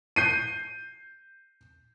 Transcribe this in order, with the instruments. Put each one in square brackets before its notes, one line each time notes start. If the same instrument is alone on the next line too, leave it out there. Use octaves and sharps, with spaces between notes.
[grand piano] G6 C7 D#7